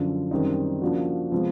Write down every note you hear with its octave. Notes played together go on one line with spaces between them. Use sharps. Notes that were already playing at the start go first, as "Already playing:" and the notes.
Already playing: F#2 D3 F3
F#2 D#3 G3 C4 D#4
C#3 F3 A#3 D4 F#4
C3 F3 G#3 B3